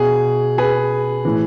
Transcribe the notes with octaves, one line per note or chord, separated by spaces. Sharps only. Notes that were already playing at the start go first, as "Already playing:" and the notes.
Already playing: B2 G#4
G#4 B4
A2 E3